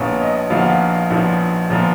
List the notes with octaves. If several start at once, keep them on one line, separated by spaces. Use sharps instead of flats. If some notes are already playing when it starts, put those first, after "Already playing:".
Already playing: A#1 A#2 F3 B3 C#5
D#5
A#1 A#2 F3 B3 F5
F#5
F5
A#1 A#2 F3 B3
A#2 F3 B3